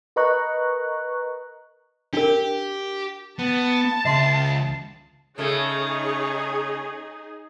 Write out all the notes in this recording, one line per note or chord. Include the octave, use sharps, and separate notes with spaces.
A#4 B4 D#5 A#5 C#6 F#6
D4 G4 A#4
B3 A5
C#2 E5 C6 C7
C#3 A3 D#4 G#4 C#5